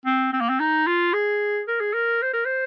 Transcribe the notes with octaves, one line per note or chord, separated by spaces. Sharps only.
C4
C4
A#3
C4
D#4
F4
G#4
A#4
G#4
A#4
C5
A#4
C5